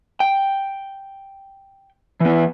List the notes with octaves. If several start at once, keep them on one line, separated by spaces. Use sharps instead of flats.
G5
E3 B3